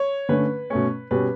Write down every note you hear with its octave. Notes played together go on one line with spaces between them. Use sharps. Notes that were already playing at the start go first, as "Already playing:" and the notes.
Already playing: C#5
D3 A3 C#4 B4
B2 A3 C#4
B2 G3 C#4 B4